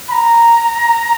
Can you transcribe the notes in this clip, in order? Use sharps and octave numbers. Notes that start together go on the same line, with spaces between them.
B5
A#5